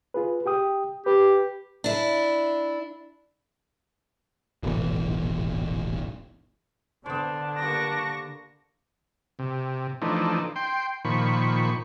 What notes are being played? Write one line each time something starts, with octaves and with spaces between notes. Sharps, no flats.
F4 G#4 B4
G4 G5 D#6
G4 B4
D4 E4
D1 G#1 B2 E3
D3 B3 D4 C5
A#3 G4 A5 C#6 A#6
C3
E3 F3 A3 D4 D#4
G5 C6
A#2 D#3 F3 B5 C#6